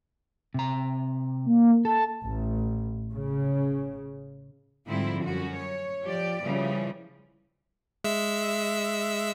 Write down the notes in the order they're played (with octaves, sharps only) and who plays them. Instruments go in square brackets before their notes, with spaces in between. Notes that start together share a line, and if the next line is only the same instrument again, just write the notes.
[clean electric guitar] C3 A#5
[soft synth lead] A#3
[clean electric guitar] A4 [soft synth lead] A5
[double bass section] A1
C#3
[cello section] G#2 D3 F3 G3 C4 E4
F#2 C#4 F#4
C#5
F3 G4 D5
C#3 E3 F3 G3
[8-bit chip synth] G#3 E5 E6